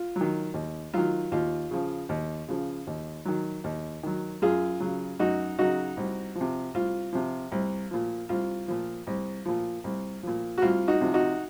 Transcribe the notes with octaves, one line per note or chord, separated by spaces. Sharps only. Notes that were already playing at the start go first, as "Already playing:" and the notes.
Already playing: F4
F#3
D#3
D#2
D#3 F#3 F4
D#2 F4
C#3 F3
D#2
C#3 F3
D#2
D#3 F#3
D#2
D#3 F#3
F#2 F4 G#4
C#3 F#3
F#2 D#4 F#4
C#3 F#3 D#4 F#4
C2
F3
C3
C2 F4
C3 F3
C2
A#2 F3
C2 F4
A#2 F3
C2
A#2 F3
C2
A#2 F3
F#4
C2 F4
D#4 F#4
C3 F3
D#4 F#4